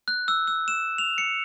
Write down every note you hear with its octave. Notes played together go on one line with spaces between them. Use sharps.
F#6
E6
E6
E7
F7
C#7